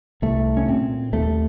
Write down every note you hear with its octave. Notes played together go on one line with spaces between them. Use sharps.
C2 A3
C#4
A#2 C4
D#2 A3